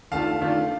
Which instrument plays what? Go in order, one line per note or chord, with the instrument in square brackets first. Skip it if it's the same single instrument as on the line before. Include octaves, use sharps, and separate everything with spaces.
[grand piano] D#3 A3 D4 F4 F5 A5
D#3 A3 D4 F4